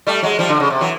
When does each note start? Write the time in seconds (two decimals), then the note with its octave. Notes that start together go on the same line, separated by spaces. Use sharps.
0.07 G3 A3
0.22 F#3 G#3
0.39 F3 G3
0.49 D3
0.60 C#3
0.70 C3
0.81 E3 F#3